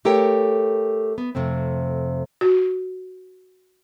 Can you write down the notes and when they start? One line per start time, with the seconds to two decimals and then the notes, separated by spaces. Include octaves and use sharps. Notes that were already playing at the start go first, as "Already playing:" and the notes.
0.05 A3 G4 A4 A#4 C#5 G5
1.18 B3
1.35 F2 C3 A3 C4
2.41 F#4